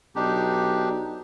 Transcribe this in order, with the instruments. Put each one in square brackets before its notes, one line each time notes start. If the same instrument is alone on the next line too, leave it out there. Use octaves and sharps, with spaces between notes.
[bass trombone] B1 [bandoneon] D4 D#4 G4